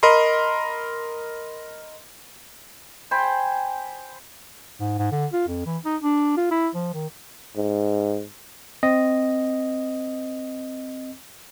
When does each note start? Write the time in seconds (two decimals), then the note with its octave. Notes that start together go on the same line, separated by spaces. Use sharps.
0.03 A#4 D#5 B5 C6
3.11 C5 G5 G#5 B5
4.80 G#2
4.98 G#2
5.12 D3
5.33 F4
5.48 F2
5.66 E3
5.85 D#4
6.01 D4
6.37 F4
6.51 E4
6.74 F3
6.94 D#3
7.56 G#2
8.83 C4 D#5